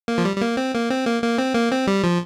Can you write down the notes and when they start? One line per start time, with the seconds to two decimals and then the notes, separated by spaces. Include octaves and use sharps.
0.08 A#3
0.18 F3
0.25 G3
0.36 G3
0.41 A#3
0.57 C4
0.74 A#3
0.90 C4
1.06 A#3
1.22 A#3
1.38 C4
1.55 A#3
1.71 C4
1.87 G3
2.04 F3